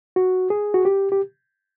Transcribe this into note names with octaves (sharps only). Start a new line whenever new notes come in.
F#4
G#4
F#4
G4
G4